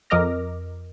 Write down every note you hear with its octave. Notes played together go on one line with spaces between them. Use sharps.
F2 A#4 D#5 D6 F6 A#6